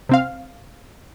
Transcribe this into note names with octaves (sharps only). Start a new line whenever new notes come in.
C3 C4 F5